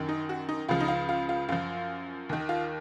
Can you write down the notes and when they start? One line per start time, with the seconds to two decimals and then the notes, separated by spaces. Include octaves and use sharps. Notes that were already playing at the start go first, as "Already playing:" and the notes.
Already playing: F#2 D#3
0.09 D#4
0.29 F#4
0.49 D#4
0.68 C#2 C#3 F3 F4
0.80 D#4
0.88 F4
1.09 F4
1.29 F4
1.49 F#2 F3 F4
2.29 D#2 D#3
2.49 F4